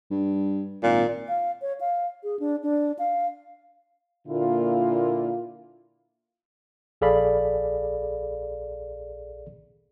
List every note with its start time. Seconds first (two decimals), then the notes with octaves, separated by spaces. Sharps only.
0.10 G2
0.83 G#1 A#2
1.28 F5
1.62 C#5
1.81 F5
2.24 G#4
2.40 D4
2.63 D4
2.99 F5
4.28 A#2 D3 A#3 E4 F4
7.01 A#1 G#4 A4 D5 F5 B5